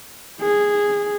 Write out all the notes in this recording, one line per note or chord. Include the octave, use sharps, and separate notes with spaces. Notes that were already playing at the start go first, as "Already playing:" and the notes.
G#4